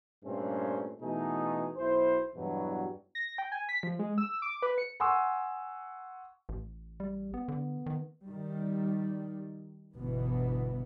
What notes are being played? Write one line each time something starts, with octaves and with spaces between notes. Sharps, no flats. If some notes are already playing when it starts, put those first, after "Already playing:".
G2 A#2 A3 C4 C#4
B2 E3 A3 D#4 G#4
B1 E4 C5
E2 G2 B2 E3 F#3
A#6
G5
G#5
B6
F3
G#3
E6
D6
B4
C#7
F#5 G#5 C6 C#6 D#6 E6
A1
G3
B3
D3
D#3
D#3 G3
G1 B2 E3 B3